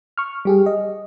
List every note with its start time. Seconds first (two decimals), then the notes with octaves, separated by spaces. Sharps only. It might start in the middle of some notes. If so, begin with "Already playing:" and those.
0.18 C#6 F6
0.45 G3 G4 G#4
0.66 D#5